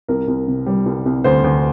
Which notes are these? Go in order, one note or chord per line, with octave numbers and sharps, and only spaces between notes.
C2 A#4
C2
C3
G3
C2
C2
D2 C5
D2